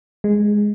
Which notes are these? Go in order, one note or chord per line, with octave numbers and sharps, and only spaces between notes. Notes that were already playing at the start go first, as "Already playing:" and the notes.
G#3